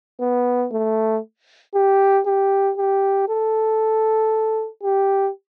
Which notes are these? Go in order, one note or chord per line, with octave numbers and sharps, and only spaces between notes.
B3
A3
G4
G4
G4
A4
G4